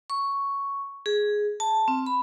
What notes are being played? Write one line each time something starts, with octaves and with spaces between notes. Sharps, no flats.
C#6
G#4
A5
C4
B5